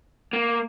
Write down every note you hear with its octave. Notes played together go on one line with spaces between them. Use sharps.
A#3